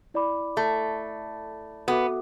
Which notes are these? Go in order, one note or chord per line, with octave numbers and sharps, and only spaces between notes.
E4 D5 B5 D6
A3
B3 F#4 A4 E5 D6